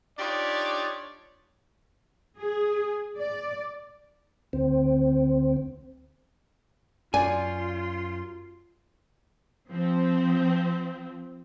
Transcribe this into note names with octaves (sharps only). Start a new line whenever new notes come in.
D4 D#4 F4 G4 C#5 D5
G#4
D5
D2 C4
F#2 F4 D5 G#5 C6
F3 C4